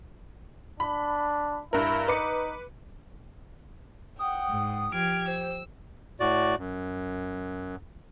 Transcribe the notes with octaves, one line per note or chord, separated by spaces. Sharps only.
D4 B5
G2 E4 A#4
D#4 B4 D6 C#7
F#5 G5 D#6
G#2
F3 G4 F6 G#6 D7
C5 E6
A2 F#4 D5
F#2